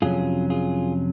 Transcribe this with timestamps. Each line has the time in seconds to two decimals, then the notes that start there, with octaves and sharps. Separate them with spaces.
0.02 F2 C3 F#3 C#4 F4 G#4
0.50 F4 G#4